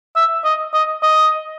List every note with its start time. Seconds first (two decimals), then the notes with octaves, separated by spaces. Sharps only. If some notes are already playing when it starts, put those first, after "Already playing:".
0.16 E5
0.45 D#5
0.74 D#5
1.02 D#5